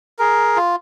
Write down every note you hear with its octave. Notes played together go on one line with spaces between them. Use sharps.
G#4 A#4
F4